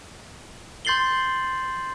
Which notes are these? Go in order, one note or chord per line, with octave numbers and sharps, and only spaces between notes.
C6 G6 A6 C7 F#7 G7